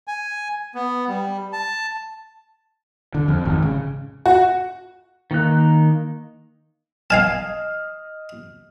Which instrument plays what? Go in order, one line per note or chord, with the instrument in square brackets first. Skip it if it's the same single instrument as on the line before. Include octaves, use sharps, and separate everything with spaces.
[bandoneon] G#5
B3
G3
A5
[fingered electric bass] D3
F2
G#1
C#3
[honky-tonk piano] F#4
[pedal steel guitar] D#3 A#3 D#4 F#6
[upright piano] D#5 F6 [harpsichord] F5 G#5 A5